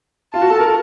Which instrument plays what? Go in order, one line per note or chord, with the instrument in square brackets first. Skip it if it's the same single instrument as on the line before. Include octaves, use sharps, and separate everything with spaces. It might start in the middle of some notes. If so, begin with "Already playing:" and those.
[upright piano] F4 [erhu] A5
[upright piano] F#4
A4
A#4